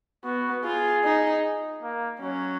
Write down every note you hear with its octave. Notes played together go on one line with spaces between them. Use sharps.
B3 F#4
F4 G#4
D#4
A#3
F#3 C#4